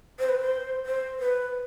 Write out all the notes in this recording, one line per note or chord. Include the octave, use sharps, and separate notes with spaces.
C5
B4
C5
C5
B4